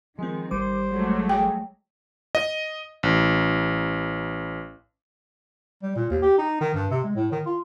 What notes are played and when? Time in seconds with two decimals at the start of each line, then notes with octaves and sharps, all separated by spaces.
0.19 D#3 F3 G#3 C4
0.51 G#1 G3 C5 D6
0.91 F#3 G#3 A3
1.29 G#4 G5
2.35 D#5
3.03 A1
5.83 G3
5.96 A#2
6.10 D#2
6.22 G4
6.38 D#4
6.61 D#3
6.74 G2
6.91 C3
7.04 G#3
7.15 A2
7.32 D#3
7.46 F4